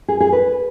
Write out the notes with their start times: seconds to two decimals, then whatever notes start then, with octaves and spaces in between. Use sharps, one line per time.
0.08 G#4
0.20 G#4
0.32 B4